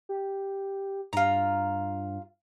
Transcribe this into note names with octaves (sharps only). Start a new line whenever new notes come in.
G4
G2 F4 A#5